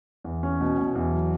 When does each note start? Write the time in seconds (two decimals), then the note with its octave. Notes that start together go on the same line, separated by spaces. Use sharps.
0.24 E2
0.43 C#4
0.61 B2
0.78 B2
0.95 E2
1.13 F#3